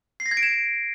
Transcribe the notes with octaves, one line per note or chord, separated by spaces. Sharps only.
C7
A#6
G#6
D7
E7